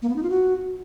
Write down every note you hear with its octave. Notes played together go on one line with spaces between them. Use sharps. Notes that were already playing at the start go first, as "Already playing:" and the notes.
A#3
B3
D#4
F4
F#4